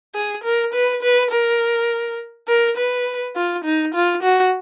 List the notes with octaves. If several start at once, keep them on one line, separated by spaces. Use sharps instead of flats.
G#4
A#4
B4
B4
A#4
A#4
B4
F4
D#4
F4
F#4